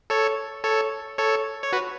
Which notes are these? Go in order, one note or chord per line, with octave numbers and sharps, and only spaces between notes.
A4 C#5
A4 C#5
A4 C#5
C#5
F#4 B4